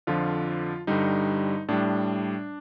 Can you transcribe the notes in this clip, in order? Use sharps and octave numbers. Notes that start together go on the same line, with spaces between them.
F2 D3 F3 F4
G2 D3 G3 D#4
A2 G3 D4